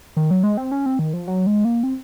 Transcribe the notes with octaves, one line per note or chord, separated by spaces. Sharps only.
D#3
F#3
G#3
C4
C#4
C4
D#3
F3
F#3
G#3
A#3
C4